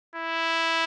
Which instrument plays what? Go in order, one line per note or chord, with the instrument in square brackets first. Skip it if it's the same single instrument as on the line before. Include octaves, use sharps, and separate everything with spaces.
[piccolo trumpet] E4